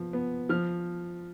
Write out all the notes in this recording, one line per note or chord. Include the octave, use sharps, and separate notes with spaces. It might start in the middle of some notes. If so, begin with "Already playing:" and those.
Already playing: F3 B3
B3
F3 F6